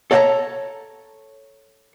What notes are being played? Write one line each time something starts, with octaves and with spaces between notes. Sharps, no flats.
A4 C#5 D5 F5 A5 A#5